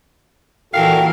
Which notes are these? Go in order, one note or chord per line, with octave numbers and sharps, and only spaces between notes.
A#2 E3 F#4 A4 A#4 F5 G5